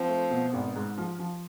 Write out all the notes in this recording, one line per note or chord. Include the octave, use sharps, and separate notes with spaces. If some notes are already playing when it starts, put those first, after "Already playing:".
Already playing: F3 C4
A3
B2
G#1
G#2
F3
F3